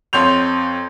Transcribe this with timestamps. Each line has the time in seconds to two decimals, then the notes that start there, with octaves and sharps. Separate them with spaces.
0.13 F2 C#5 C6 G6 F7